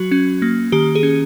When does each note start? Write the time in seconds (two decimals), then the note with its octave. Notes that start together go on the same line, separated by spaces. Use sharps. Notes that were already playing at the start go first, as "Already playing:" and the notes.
Already playing: F#3 F#4
0.11 C#4
0.42 A#3
0.72 D#3 G4
0.95 G#4
1.03 C#4